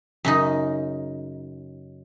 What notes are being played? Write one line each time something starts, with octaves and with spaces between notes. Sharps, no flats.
F#2 C#3 D#4